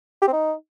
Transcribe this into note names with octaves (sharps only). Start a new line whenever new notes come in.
G4
C4
D#4